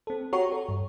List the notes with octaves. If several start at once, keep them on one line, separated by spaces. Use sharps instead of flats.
C4 A4
F#4 G4 C#5 A#5 C#6
A4 C#5
G2